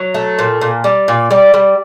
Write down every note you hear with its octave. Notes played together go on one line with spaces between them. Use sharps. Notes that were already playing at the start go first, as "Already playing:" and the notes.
Already playing: F#3
A3
A#2
A#2
G3
A#2
G3 D5
G3